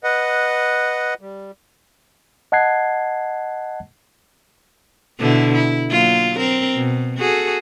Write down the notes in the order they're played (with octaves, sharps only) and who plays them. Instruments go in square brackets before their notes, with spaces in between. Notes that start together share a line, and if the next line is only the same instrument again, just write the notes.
[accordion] B4 D#5 F#5
G3
[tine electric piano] D#5 F#5 A5 F#6 G#6 C7
[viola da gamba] B2 D3 E4
E4
F#3 A#3 F4
C4 A#4
B2
F#4 G#4 A4